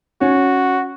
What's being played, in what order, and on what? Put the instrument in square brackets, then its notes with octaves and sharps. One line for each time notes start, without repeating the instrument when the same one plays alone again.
[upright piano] C#4 [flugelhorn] F#4